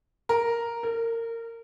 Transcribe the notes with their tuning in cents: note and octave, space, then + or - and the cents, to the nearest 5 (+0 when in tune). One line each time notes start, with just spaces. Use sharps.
A#4 +0
A#4 -25